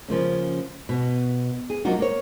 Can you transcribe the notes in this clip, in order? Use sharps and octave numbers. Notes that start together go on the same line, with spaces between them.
C#3 F3 A#3 C#4
B2
G#4
F#3 A#3 D4 D#4 F4 F#4
A#3 C#5